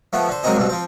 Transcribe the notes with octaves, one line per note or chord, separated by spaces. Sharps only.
F3 A3 B3
D3 C5
F#3 G#3 A#3 C4 D#4 G#4
G2 B2 C4
F3 C4